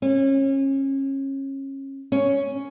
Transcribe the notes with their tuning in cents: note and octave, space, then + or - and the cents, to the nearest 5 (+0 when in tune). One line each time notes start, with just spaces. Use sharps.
C#4 -30
C#4 +5